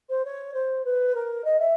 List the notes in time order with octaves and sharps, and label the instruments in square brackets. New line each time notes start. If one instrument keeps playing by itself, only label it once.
[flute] C5
C#5
C5
B4
A#4
D#5
E5